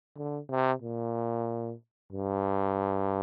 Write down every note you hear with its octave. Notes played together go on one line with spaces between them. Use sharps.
D3
C3
A#2
G2